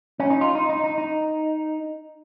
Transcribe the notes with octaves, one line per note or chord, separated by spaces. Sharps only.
C#4
D#4
F4
D#4
D#4
D#4
D#4